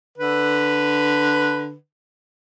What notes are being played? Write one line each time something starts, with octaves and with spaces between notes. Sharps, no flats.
D3 B4